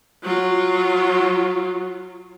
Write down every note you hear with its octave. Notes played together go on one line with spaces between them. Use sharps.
F#3 F4